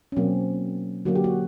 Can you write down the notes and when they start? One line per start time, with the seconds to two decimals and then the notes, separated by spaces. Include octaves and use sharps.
0.12 C#4
0.16 B2 F#3 A#3 C4
1.05 D3 F#3 A#3 F#4
1.15 G4
1.24 F#4